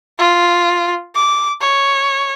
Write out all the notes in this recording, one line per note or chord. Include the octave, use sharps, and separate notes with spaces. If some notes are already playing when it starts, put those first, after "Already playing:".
F4
D6
C#5